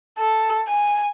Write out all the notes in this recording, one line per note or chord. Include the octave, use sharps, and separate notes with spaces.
A4
G#5